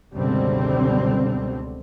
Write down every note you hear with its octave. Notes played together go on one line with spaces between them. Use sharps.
C#2 F#2 B2 D3 G3 C4